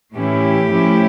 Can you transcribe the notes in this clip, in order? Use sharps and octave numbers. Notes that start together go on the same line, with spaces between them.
A2 E3 A3 C#4 E4 G4
A2 F3 A3 C#4 E4